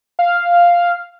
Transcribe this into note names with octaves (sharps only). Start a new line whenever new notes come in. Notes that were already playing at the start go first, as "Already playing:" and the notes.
F5